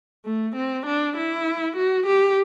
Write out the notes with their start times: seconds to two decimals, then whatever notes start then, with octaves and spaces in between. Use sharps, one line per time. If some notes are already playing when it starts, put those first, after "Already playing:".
0.25 A3
0.56 C4
0.86 D4
1.17 E4
1.77 F#4
2.06 G4